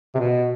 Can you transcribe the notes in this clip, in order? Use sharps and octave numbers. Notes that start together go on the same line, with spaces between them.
C3
B2